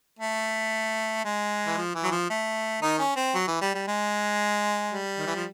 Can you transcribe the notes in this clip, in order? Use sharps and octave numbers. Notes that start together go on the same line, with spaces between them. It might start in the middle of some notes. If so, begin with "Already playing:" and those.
A3
G#3
E3
F3
E3
F#3
F3
A3
D#3 D#4
C#4
C4
F#3
E3
G3
G3
G#3
G3
D#3
E3
F3